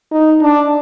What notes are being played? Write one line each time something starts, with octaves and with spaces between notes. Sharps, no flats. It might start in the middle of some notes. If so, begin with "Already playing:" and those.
D#4
D4